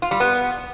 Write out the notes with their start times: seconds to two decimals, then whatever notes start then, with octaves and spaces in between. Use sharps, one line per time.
0.02 F4
0.11 G3
0.20 B3